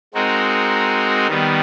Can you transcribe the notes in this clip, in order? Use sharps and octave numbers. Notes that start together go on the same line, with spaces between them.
G#3 C4 D#4 F#4 A#4
D#3 G3 B3